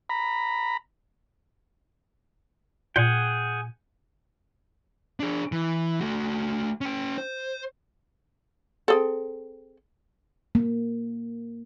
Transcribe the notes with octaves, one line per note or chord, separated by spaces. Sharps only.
A#5 B5
A#2 G#4 F#5 G5
D4 G#4
E3
A3 F#4
C#4 G5
C5
C4 G#4 A4
A#3